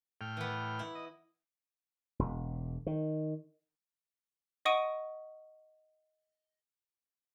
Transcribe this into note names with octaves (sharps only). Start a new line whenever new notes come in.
A2 G5 F6
E3 B3
E4
D#5
E1
D#3
D#5 F#5 C#6 D#6 D7 D#7